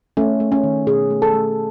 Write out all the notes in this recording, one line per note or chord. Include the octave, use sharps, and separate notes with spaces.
A3 C#4
A3
C#4
D#3
B2 G#4
A3
A4
A3